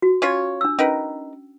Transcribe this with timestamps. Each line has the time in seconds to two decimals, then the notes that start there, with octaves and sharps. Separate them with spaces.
0.02 F#4
0.22 C#4 F4 C#5
0.61 D4 E6
0.79 C#4 D#4 A#4 B4